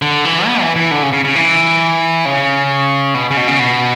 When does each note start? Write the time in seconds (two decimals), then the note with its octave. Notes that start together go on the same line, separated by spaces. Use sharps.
0.02 D3
0.25 E3
0.47 B3
0.61 E3
0.76 E3
0.91 D3
1.03 C#3
1.13 C#3
1.24 C#3
1.36 E3
2.25 C#3
3.14 B2
3.31 C#3
3.37 B2
3.48 C#3
3.59 B2